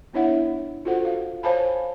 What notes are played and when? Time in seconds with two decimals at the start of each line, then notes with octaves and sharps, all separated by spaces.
0.13 B3 D4 E4 C#5 E5 F#5
0.85 F4 F#4 A4 C5 F#5
1.05 F5
1.43 C5 C#5 F5 G#5 A5 B5